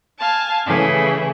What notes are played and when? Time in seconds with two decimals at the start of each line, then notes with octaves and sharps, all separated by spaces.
0.18 F5 G#5 A5
0.66 C#3 E3 A3 E4 G#4